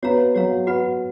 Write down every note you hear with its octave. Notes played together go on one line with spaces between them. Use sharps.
B3 F#4 C#5 F5 A#5
F#3 F#4 C#5 F5 A#5
F#4 B4 F#5 B5